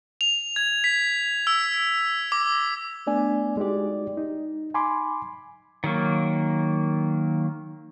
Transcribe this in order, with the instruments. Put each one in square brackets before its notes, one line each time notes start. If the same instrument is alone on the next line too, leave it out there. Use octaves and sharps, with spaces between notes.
[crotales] F7
G#6
B6
E6
D6
[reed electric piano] A3 B3 D4 D5 G#5
G#3 D#4 F#4 G4 D5
D#4
G#5 B5 C6 D6
[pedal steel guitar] D#3 F#3 A#3